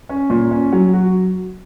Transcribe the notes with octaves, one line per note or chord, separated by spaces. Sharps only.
C#4
A#2
C#4
F#3
F#4